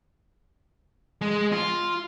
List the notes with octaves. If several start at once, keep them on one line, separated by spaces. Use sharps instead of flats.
G#3
F4